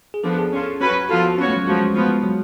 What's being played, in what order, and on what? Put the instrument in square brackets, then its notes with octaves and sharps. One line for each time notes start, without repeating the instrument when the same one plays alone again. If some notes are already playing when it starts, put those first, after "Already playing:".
[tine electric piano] G#4
[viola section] F3 B3 D4 [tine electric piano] A4
[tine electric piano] G#4
[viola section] C#4 F4 A4
F#3 C#4 F#4 B4
[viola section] F3 B3 F4 A4 [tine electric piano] F#4
[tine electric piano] F4
[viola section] B3 F#4 C#5 [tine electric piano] C#4
[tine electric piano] A3
F#3
[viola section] F3 B3 F#4 [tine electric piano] G#3
[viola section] F3 B3 F4
[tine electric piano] F#3